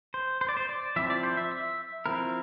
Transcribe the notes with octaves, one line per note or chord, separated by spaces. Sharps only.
C5
C5
D5
C5
D5
F3 C4 E4 E5
D5
C5
E5
E5
F3 C4 E4 A#4